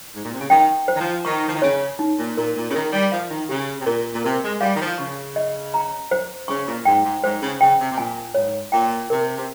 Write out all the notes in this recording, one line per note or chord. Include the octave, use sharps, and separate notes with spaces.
G#2
A#2
C3
C#3
D#3 G5
C5
D#3
F3
D#3 C#6
F3
D#3
C#3 C#5
D#4
A#2
A#2 A#4
A#2
C#3
D#3 A#4
G3
F3 F5
D#3
C#3 G4
C3
A#2 A#4
A#2
C3 A#4
G#3
G3 F5
D#3
F3
C#3 C#6
D#5
A#5
C5
C#3 C#6
A#2
G#2 G5
G#2
G#2 C5
C#3
C#3 G5
C3
C3
A#2 G#5
G#2 C#5
A#2 G5
C3 A#4
C3